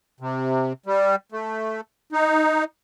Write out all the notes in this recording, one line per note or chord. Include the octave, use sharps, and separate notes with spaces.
C3
G3
A3
D#4